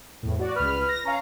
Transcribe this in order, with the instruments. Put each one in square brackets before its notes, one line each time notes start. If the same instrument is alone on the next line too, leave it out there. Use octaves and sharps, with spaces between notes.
[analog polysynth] E2 A2
F#4 D5
[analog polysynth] C#2 F6 [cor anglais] B4
[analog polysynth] A#6
[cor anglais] C#4 [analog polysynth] F5 A#5